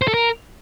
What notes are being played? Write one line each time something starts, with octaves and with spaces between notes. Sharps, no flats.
C5
A4
A#4